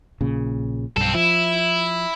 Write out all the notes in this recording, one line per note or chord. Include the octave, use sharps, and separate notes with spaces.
A#1 A#2 C#3
B1 G2 C4 A4
F3 E4